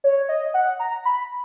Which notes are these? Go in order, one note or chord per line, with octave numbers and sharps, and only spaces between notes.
C#5
D#5
F#5
A#5
B5